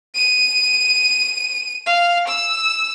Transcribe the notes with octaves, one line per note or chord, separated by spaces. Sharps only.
D#7
F5
E6